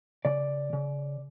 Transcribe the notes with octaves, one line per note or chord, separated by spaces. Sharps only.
C#3 D5
C#3